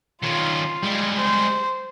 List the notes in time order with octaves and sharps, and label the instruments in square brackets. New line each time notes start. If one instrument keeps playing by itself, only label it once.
[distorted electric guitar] D#3 C#4 [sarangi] F4
[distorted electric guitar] G3 G#3
[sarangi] C5